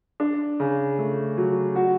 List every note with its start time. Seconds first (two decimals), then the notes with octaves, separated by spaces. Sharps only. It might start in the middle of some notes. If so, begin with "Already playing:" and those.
0.20 D4
0.60 C#3
0.99 A3
1.38 F#3
1.76 F#4